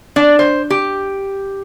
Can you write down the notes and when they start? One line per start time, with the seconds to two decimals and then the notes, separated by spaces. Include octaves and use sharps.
0.16 D4
0.39 C5
0.70 G4